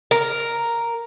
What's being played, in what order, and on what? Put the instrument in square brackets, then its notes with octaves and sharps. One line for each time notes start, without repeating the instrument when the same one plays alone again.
[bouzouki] A#4